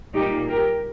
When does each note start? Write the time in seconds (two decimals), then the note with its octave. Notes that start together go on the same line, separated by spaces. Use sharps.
0.13 A#2 G3 A#3 D#4 G4
0.48 G4 A#4